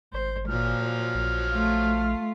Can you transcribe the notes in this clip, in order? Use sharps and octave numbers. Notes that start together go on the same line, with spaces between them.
G#1 C5
A#2 F3 F#3 F6
A#1
A3 F4